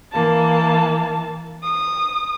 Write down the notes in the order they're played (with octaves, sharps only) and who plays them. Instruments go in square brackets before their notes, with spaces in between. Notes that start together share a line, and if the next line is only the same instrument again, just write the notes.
[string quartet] E3 A#3 A5
D#6